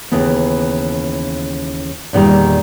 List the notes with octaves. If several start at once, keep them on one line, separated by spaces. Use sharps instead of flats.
D#2 C#3 E3 B3
E2 A#2 D#3 G3 D#4